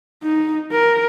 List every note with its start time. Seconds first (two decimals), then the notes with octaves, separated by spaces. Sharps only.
0.23 D#4
0.72 A#4